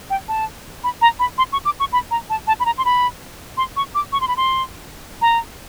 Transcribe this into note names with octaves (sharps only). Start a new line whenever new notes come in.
G5
A5
B5
A#5
B5
C6
C#6
D6
C#6
B5
A#5
A5
A5
B5
A#5
C6
B5
C6
C#6
D6
C#6
C6
B5
C6
A#5